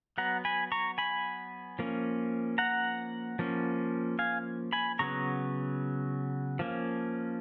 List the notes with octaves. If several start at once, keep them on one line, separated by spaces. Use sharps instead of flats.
F#3 B3 F#5 A#5
G#5 B5
A#5 C#6
G#5 B5
F3 A#3 C#4
F#5 A#5
F3 A#3 C#4
F5 G#5
G#5 B5
C#3 F#3 B3 A#5 C#6
F3 A#3 C#4